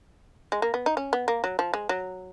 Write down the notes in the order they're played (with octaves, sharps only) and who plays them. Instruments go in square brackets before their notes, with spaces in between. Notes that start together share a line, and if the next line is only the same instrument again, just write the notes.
[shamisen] G#3
A#3
B3
D#4
C#4
B3
A#3
F#3
F3
G#3
F#3